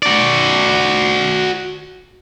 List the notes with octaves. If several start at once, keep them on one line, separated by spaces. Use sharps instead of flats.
F#4 D5